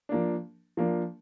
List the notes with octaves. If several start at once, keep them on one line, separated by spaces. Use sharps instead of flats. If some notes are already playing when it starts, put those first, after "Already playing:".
F3 A#3 D4
F3 A#3 D4